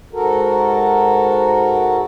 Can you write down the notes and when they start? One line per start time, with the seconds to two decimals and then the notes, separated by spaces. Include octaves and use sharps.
0.13 G#2 F#4 A4 A#4